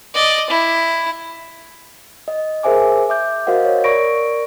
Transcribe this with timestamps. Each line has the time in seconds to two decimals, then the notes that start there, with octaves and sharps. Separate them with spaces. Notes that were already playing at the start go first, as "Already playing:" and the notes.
0.14 D5 D#5
0.50 E4
2.28 D#5
2.63 G#4 A#4 C5 E5 G#5 D6
3.09 E5 D6 G6
3.47 F#4 A#4 C5 D#5 F5 F#5
3.65 C#5
3.84 A#4 D5 B5 C#6 A#6 D7